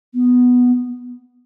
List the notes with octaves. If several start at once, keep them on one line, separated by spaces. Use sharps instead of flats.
B3